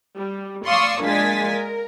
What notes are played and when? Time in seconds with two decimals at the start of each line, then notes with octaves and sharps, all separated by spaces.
0.17 G3
0.66 D5 F5 C6 C#6 D#6 E6
1.03 A#2 G#3 D4 G#5 A6 B6
1.51 A#4